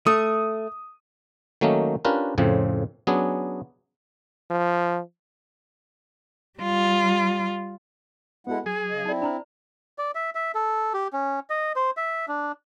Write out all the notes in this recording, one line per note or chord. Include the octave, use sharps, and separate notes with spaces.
A3 D#6
D#3 F#3 A3 A#3 C#4 D#4
C#4 D4 F4 G4 A#4 B4
F2 A2 C#3 F3 C4
F#3 B3 C#4 D4 G#4
F3
G3 F4
G#3 B3 E4 F#4 A4 F#5
F#3 G#4 G#5
C#3 D#5
C4 D#4 E4 D5
D4 C5 A#5 B5
D5
E5
E5
A4
G4
C#4
D#5
C5
E5
D4